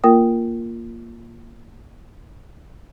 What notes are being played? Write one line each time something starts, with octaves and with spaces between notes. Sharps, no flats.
A#3 F4 A#4 G5 D#6